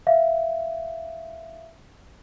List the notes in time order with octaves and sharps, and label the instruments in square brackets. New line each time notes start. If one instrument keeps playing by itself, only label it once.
[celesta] E5 F5